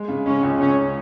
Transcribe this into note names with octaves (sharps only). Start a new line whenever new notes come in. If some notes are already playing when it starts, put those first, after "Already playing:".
Already playing: G#3
C#3
G#3 C#4
C#2
C#2 C#4